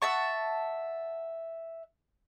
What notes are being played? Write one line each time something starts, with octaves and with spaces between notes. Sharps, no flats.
E5 F#5 A5 C#6